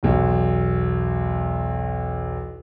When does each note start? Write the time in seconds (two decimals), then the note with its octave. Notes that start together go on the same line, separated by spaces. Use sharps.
0.03 B1 E2